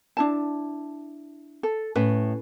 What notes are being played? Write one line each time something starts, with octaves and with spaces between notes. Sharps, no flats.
D4 E4 A5
A4
A2 C#4 B4